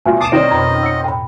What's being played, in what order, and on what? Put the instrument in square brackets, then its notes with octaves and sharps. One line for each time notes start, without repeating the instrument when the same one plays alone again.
[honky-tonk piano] A1 B2 F4 [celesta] G#5
[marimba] B2 [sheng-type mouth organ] A5 D6 D#6 [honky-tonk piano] C7 E7
[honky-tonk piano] D#3 C4 C#4 [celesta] D5 D7 [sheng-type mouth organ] D#5
[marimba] F2 B2 [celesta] A#5 B5
[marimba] F#5 [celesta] E6 C#7
[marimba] A2 [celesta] G5 B5